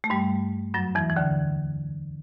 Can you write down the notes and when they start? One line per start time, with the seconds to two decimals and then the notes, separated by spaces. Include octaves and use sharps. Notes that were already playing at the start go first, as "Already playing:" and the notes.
0.04 A3
0.10 G2 G3
0.74 F#2 F#3
0.95 E2 E3
1.10 E3
1.16 D2 D3